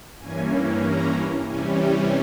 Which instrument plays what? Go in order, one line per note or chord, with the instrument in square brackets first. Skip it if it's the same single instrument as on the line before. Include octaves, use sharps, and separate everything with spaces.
[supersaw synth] G2 E3 A#3 C#4 G#5
A#5
C3 E3 G3 C#4 G#5
G5